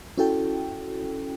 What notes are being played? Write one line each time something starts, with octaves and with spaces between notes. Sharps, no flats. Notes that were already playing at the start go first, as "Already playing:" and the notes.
C#4 E4 F#4 A4 G5